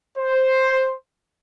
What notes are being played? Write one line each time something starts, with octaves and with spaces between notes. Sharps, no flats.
C5